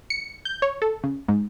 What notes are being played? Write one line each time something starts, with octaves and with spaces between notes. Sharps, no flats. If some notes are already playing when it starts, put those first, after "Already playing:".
C#7
G6
C#5
A4
C#3
G#2